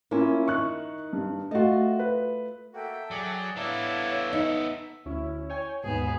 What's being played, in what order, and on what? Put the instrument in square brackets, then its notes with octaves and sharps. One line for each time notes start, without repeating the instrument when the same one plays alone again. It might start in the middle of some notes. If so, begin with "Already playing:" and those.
[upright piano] A#3 C#4 F4 [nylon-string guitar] E4
[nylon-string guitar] D#3 [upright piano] C#6 F#6
[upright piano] G2
[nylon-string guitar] A3 F4 [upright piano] F#4 D#5
[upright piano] B4
[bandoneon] A#3 F#4 [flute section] A4 E5 G5
[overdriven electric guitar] F#3 [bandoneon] G#4 D5
[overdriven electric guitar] B3 A4 [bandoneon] D4 E4 [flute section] C#5 F5
[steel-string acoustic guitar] D#4 [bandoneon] E5
[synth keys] D2 C#4 E4
C#5 G5 G#5
[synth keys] D#2 G#2 B2 [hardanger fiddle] B3 G#4